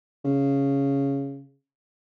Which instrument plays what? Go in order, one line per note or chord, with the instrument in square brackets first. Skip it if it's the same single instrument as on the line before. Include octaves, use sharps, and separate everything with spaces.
[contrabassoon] C#3